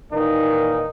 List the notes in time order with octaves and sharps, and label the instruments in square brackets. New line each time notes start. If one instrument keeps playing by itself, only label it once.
[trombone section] A#2 D#3 E3 A#3 D#4